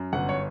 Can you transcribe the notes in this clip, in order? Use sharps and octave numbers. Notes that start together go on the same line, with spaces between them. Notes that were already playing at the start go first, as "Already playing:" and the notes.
Already playing: F#2
G1 F#5
C#5